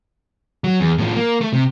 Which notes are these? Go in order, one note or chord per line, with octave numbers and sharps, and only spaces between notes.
F#3
E2
A2 F3
A#3
A3
C3